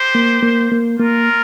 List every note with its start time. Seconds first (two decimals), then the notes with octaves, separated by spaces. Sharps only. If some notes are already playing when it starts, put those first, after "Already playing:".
Already playing: G4 C5
0.15 A#3
0.43 A#3
0.72 A#3
0.99 A#3 F4 A#4